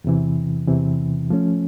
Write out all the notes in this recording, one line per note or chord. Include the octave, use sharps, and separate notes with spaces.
E2 C3 E3
E2 C3 E3
F3 A3 C#4